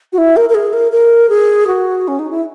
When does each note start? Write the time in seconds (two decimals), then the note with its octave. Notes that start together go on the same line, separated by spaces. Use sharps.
0.13 F#4
0.18 E4
0.37 A#4
0.49 A#4
0.55 G#4
0.73 A#4
0.92 A#4
1.29 G#4
1.67 F#4
2.08 C#4
2.19 D#4
2.31 E4